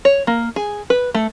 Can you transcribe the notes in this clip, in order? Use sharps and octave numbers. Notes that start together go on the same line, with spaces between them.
C#5
A#3
G#4
B4
A3